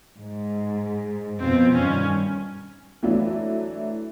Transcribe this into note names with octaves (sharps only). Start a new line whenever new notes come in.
G#2
F2 B2 C4 F4
G2 D#3 C#4
E3 F#3 A3 D4 E4